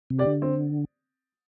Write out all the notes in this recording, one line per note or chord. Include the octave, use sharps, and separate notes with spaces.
C3
G4 D5
D3
C4